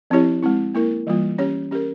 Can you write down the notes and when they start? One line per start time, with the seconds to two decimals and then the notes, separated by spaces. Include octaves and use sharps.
0.10 F3 C4 E4 G4 C#5
0.43 G#3 C4 E4
0.74 A#3 E4 A#4
1.07 E3 G3 A#3 F4
1.38 C#4 G4 C#5
1.71 C#4 G4 A#4